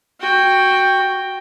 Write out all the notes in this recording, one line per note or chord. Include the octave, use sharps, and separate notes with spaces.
F#4 G5